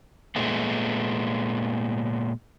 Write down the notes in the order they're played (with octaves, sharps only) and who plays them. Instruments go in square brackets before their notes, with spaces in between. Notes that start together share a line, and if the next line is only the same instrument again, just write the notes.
[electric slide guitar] A#2 G#3 A3 B3